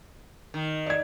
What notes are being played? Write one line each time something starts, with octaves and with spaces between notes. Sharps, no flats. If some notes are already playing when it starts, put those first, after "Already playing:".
D#3
D5 G#6